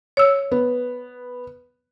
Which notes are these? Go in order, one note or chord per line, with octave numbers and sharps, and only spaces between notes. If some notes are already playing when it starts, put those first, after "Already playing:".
C#5 E6
B3